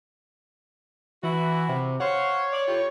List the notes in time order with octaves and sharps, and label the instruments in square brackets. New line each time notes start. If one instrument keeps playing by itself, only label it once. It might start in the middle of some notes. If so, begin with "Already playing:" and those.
[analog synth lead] E3 [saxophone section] E4 F#4
[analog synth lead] C3
[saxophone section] C5 F5 F#5 [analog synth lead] C#5
[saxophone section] D5
A2 F4 G4